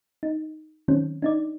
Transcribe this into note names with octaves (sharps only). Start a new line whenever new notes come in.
D#4
D#3 F#3 C4 C#4
D4 D#4 D5